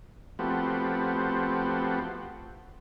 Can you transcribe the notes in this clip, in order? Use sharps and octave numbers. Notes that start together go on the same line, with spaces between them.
F3 A3 B3 C4 F#4 G4